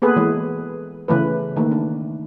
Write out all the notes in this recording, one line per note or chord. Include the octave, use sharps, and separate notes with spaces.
A#3 B3 G#4 A4 B4
E3 G#3
C#3 E3 A3 B4
D#3 A3 A#3
D4